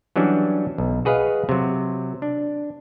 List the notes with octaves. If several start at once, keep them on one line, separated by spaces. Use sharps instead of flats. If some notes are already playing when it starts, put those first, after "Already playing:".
E3 F#3 G3 C#4 D4
B1
F#4 G#4 B4 D#5 F5
C3 F#3
D4